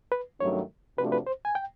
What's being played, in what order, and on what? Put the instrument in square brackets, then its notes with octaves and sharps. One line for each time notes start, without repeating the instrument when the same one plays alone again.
[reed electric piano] B4
[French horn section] G2 D#3 F#3 A3 C#4 [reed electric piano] C#5
[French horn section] C3 F3 A3 D4 F#4 [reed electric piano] B4
[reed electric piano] B4
C5
G#5
G5